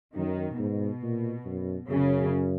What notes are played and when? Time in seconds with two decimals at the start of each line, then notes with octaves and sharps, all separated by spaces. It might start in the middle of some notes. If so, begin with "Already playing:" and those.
0.15 F#2 D#3
0.58 G#2 B2
1.03 A#2
1.45 F#2
1.89 F#2 C#3